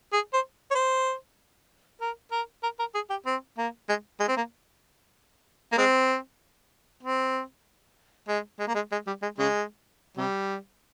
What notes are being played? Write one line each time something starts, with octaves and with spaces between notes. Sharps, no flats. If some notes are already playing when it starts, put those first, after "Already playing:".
G#4
C5
C#5
C5
A#4
A#4
A#4
A#4
G#4
G4
C4
A#3
G#3
G#3
C4
A#3
A#3
G#3 C4
C4
G#3
G#3
A#3
G#3
G#3
G3
G#3
C#3 G#3
C3 G3